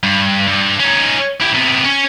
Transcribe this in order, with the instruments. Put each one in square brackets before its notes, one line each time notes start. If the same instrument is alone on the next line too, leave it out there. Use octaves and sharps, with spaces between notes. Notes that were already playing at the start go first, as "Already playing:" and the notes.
[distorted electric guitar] G2
G2
C#4 D#4
E4 G4
C3 B3
C#4